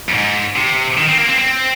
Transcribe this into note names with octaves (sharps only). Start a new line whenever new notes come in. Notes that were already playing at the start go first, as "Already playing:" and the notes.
F2
G#2
C3
D#3
C4
A#3
C4
C4